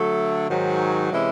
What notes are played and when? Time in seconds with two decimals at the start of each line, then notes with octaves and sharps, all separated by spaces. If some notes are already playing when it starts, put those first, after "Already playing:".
Already playing: D3 F#3 A3
0.49 G#2 D#3 F#3
1.11 C3 E3 G#3 C#4 E4